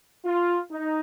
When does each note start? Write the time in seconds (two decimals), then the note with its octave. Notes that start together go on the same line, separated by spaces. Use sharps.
0.25 F4
0.71 D#4